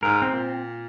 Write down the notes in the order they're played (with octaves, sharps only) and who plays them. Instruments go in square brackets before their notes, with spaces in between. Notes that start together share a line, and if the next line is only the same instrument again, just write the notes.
[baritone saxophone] G#2 [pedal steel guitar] A#4
[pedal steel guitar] C4
[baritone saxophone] A#2